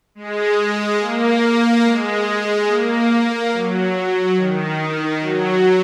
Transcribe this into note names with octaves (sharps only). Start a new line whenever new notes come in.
G#3
A#3
G#3
A#3
F#3
D#3
F#3